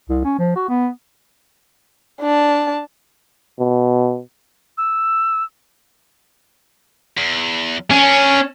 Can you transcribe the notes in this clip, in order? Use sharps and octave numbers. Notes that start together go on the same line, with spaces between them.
C2
C#4
F3
F#4
B3
D4 A5
B2
E6
E2
C#4 D4 A#4